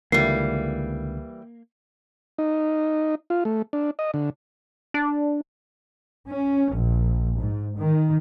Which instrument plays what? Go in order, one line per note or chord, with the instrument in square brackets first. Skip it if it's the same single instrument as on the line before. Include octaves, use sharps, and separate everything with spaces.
[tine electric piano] C#2 D3 [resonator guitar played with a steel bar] E3 G3 [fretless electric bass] A#3 [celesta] C7
[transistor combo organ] D#4
F4
A3
D4
D#5
D3
[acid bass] D4
[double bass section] C#4
A#1
G#2
D#3